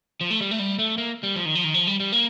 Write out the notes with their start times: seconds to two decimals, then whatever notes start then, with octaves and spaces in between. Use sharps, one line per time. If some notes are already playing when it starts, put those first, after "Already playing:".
0.21 F3
0.31 A3
0.41 G3
0.51 A3
0.59 G3
0.79 A3
0.98 A#3
1.23 G3
1.36 F3
1.45 D#3
1.55 F3
1.64 D#3
1.74 F3
1.87 G3
2.00 G3
2.12 A#3